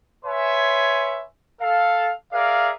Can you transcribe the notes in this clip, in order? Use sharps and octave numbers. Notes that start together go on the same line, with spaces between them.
B4 C#5 E5 G#5 C6
A4 F5
G#4 A#4 D5 E5 F5